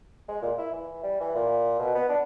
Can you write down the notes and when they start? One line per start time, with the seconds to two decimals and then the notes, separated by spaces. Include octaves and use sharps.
0.28 G#3
0.42 A#2
0.58 E4
0.73 E3
1.03 G3
1.20 E3
1.35 A#2
1.79 B2
1.95 B3
2.09 D4